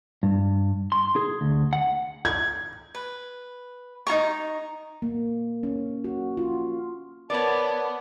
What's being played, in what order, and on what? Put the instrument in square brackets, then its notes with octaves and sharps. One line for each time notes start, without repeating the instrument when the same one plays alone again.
[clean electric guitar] G2
C6
G#4
D2
F#5
[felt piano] G#6
[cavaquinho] B4
D#4 F4 A#5 C#6
[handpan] A#3
C#4
F#4
F4
[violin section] B3 [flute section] A#4 A5 B5 [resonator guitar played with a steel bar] C#5 D5